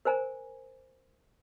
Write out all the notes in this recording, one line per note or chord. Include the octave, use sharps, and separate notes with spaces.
A#4 C5 G#5 A#5